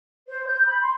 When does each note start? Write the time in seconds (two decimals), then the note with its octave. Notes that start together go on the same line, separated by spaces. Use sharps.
0.28 C5
0.46 G6
0.66 B5
0.82 C6